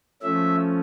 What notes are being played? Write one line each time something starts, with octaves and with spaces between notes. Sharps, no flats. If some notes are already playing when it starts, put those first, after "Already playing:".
F3 A3 C#4 E5